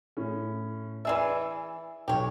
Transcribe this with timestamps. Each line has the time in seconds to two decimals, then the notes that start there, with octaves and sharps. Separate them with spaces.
0.17 A2 C#4
1.05 E3 G#4 D5 E5 E6
2.08 B1 G4 C#5